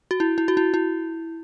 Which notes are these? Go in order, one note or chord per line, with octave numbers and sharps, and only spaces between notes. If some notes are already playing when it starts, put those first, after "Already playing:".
F#4
E4
E4
F#4
E4
E4